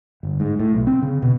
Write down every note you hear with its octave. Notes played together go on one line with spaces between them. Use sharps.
G1
G#2
A2
B1
C4
C#3
B2